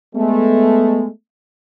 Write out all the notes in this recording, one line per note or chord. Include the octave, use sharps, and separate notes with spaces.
G#3 A3 B3